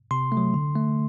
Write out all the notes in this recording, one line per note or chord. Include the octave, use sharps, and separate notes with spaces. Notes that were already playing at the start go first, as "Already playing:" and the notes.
C3 C6
A3
F#3
D3
A3